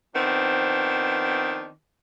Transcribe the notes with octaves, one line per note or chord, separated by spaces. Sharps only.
D#3 F3 B3 C4 D4